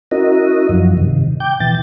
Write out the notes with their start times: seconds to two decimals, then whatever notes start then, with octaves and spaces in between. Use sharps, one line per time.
0.11 C#4 E4 F#4 A#4 D#5
0.69 F#2 F3 F#3
0.98 G2 C3 D#3
1.40 G5 D6 G6
1.60 B2 E3 G5 A6